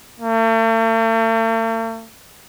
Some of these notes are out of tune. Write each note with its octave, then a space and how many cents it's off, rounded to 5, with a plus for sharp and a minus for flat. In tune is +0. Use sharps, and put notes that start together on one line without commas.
A3 +45